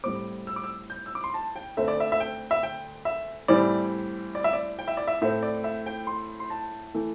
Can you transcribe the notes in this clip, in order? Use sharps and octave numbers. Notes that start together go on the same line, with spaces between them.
A2 G3 C4 D6
E6
D6
E6
G6
E6
D6
C6
A5
G5
D2 D3 A3 C4 E5
D5
E5
E5
G5
E5
G5
E5
A2 E3 G3 C4 D5
D5
E5
D5
G5
E5
D5
E5
A2 A3 C4 E5
D5
E5
G5
C6
C6
A5
E3 A3